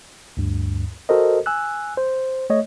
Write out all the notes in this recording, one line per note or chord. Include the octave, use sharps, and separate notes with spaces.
D2 G2
F#4 A4 A#4 C5 D#5
G#5 E6 F#6
C5
A3 C#5 D#5